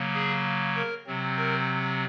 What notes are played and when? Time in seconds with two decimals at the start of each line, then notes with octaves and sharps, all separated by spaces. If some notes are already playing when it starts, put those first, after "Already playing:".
Already playing: C#3 F#3 A#3
0.14 G#4
0.76 A#4
1.07 C3 F#3 C4
1.37 A#4